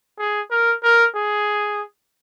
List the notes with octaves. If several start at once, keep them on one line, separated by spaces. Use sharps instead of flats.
G#4
A#4
A#4
G#4